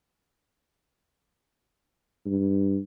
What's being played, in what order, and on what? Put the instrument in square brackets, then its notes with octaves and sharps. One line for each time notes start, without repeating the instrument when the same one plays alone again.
[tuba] G2